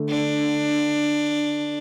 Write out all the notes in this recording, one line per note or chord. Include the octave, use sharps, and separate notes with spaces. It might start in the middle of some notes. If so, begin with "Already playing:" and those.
Already playing: D3 A3
D4